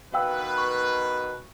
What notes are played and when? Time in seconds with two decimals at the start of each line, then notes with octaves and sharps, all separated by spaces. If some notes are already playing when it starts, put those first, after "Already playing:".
0.14 B2 D#3 B4 F5 G5 E6
0.58 C#6